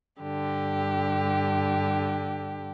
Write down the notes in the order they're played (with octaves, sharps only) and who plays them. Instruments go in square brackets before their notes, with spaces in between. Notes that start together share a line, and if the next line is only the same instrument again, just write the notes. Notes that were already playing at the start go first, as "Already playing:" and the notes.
[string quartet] G2 D3 G4